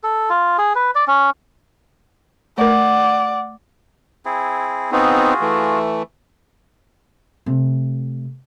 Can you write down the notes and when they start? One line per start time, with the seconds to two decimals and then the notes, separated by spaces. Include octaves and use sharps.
0.04 A4
0.30 F4
0.58 G#4
0.75 B4
0.95 D5
1.08 C#4
2.58 A3 A#4 D5 F#5
4.25 C4 E4 G#4
4.92 B3 C4 D#4 F4 F#4 G#4
5.41 E3 A3
7.46 C3 A3